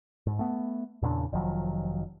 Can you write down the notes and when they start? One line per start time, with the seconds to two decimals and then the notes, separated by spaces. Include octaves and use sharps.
0.26 G#2
0.39 A3 B3
1.02 E2 A#2 C#3 D4
1.32 F1 D#3 F3 F#3